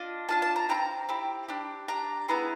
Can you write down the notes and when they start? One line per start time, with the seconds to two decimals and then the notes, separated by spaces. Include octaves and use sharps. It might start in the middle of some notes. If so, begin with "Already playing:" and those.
Already playing: D4 F4 D#5
0.29 D4 F4 G#4 A5
0.42 A5
0.56 A#5
0.69 C4 E4 A#5
0.74 G4
1.09 C4 E4 G4
1.48 D4 G4
1.88 D4 G4 A#5
2.28 B3 E4 G#4 A#5